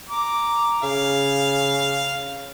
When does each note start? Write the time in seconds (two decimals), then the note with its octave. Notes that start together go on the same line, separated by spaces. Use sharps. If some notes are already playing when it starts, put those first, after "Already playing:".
0.10 A#5 D6
0.83 C#3 F5